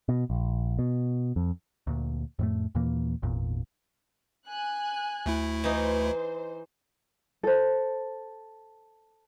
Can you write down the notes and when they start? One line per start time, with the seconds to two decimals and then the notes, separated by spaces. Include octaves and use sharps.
0.09 B2
0.30 A#1
0.79 B2
1.36 F2
1.87 D2 A#2
2.39 F2 A2 A3
2.75 D#2 A#2 E3 A#3
3.22 G#1 E2 A#2
4.49 G#5 F#6
5.26 D2 A3 E4
5.64 E3 D#4 C5
7.43 A4 C5